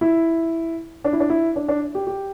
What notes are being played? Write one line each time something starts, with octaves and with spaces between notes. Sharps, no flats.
E4
D4
E4
D4
E4
D4
D4
G4
G4